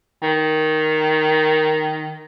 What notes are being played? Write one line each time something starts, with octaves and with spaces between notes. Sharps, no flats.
D#3